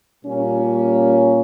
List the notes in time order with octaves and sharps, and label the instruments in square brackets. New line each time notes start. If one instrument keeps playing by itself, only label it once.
[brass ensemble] A#2 G3 A#3 C#4